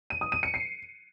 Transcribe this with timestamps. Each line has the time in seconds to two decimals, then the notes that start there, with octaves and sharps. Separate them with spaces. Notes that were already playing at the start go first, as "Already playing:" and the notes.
0.10 D#7
0.21 D#6
0.32 D#7
0.43 C#7
0.54 C7